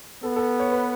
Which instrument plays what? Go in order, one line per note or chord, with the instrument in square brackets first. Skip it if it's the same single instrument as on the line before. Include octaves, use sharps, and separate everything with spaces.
[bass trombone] B3 [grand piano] A4
[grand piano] A4
C#5
B4